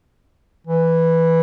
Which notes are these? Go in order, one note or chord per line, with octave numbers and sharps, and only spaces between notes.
E3